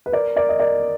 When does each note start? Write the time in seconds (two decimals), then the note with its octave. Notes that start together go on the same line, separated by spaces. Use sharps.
0.06 B4
0.12 A#4 D5
0.36 A#4 D5
0.49 D#5
0.60 A#4 D5